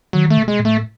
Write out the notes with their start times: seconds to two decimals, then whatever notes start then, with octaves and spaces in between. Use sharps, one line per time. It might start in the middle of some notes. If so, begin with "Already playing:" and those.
0.13 D#3 F#3
0.30 A3
0.37 B2
0.48 G#3
0.59 A2
0.65 A3